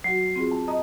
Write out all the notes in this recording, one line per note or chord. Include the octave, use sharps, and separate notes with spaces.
F#3 F#4 C7
C4 F4 G#4
A5
D#5 A#5 D#6